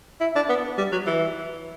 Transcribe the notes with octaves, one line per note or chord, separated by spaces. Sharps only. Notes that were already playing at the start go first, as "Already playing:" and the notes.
E4
D4
B3
G3
F#3
E3